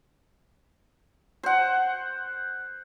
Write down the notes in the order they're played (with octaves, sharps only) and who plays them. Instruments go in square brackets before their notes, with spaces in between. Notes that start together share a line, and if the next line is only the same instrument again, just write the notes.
[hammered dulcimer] C5 F#5